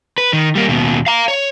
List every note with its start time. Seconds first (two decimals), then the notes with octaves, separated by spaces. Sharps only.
0.18 B4
0.33 D#3
0.55 G3 A#3
0.69 D#2 B2
1.06 F5 A#5
1.28 C#5